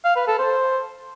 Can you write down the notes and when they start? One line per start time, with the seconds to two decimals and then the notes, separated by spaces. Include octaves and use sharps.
0.05 F5
0.16 B4
0.27 A4
0.39 C5